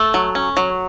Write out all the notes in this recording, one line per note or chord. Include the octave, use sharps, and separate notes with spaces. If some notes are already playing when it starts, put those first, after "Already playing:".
Already playing: A3 A4
F#3
C#4
F#3